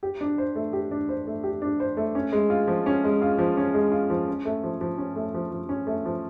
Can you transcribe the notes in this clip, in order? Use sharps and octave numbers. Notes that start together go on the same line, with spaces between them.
G4
D4
C5
A3
G4
D4
C5
A3
G4
D4
C5
A3
C#4
G#3
F4
F3
C#4
G#3
F4
F3
C#4
G#3
F4
F3
C#4
A3
F3
F3
C#4
A3
F3
F3
C#4
A3
F3